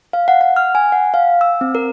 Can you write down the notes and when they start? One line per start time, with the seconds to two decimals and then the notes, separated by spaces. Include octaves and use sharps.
0.13 F5
0.28 F#5
0.41 F#5
0.56 F6
0.75 G#5
0.92 F#5
1.14 F5
1.41 E6
1.61 C4
1.75 A#4